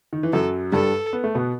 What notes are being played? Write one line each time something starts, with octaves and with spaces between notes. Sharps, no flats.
D#3
E3
F#2 F#3 A4
G2 G3 A4
B3
A3
B2 B3